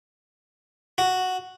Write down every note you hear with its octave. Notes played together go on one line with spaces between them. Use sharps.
F#4